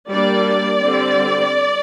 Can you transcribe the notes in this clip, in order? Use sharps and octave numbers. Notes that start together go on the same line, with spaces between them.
G3 A#3 D4 D5
D3 G3 C4